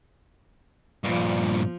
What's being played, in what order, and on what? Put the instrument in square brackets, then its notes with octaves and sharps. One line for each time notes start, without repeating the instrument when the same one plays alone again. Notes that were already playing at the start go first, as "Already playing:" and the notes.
[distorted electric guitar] G2 A#2 [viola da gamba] F3